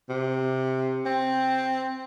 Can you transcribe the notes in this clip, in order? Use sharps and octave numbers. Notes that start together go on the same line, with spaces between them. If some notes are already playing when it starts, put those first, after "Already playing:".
C3
C4